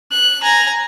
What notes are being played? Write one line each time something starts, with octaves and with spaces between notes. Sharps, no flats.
F#6
G#5 A#5